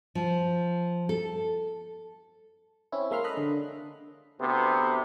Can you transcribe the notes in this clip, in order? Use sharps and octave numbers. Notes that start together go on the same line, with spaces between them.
F3
A4
C4 C#4 E4
G#3 A#3 E5 C6 F6
A4 D#5 B5 F#6
D3
D2 C3 B3